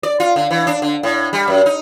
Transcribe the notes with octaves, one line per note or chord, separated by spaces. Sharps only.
D5
F4
D3
E3
D4
D3
A2
G3
F#2
D#4